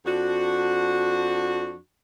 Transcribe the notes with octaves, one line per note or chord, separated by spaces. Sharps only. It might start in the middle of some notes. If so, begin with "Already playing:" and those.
F2 D4 F#4